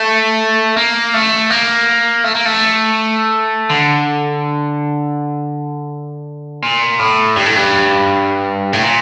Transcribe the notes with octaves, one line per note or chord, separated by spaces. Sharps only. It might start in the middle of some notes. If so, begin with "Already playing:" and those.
Already playing: A3
A#3
A3
A#3
A3
A#3
A3
D3
A#2
A2
G2
A2
G2
A2
A#2